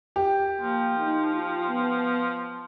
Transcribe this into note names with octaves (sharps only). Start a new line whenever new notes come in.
G4
F3 A#3
D#4
F4
B3